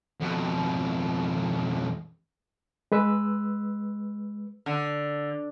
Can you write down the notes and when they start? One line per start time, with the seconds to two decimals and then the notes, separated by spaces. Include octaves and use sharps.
0.20 F2 B2
2.92 G#3 B4 E6
4.66 D3